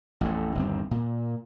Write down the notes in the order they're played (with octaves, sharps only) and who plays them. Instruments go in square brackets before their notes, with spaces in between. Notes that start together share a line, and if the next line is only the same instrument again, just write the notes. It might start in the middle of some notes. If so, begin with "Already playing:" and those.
[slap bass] A1 F2 A2
G1 D#2 C4
A#2